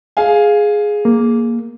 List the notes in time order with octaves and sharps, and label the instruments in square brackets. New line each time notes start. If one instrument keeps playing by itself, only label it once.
[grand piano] G#4 F5 G#5
[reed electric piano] A#3